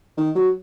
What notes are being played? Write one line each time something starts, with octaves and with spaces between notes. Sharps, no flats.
D#3
F#3